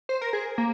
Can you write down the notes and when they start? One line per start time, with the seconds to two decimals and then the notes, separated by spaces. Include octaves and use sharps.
0.09 C5
0.21 A#4
0.33 G#4
0.58 A#3